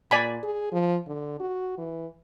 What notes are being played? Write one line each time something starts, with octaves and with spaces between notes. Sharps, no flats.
A#2 D5 G#5 B5
G#4
F3
D3
F#4
E3